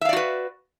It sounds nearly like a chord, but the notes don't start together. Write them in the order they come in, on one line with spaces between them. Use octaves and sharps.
E5 F5 D5 F#4 B4